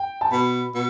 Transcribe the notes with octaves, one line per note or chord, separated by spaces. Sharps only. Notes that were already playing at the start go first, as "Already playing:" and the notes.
Already playing: G5
A5
B2 B5
B2